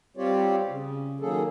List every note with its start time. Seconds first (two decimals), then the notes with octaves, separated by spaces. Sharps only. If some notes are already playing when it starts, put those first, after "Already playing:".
0.17 G3 C4 F4 G4 C#5 D5
0.68 C#3
1.20 D#3 F#3 A#3 G#4 A4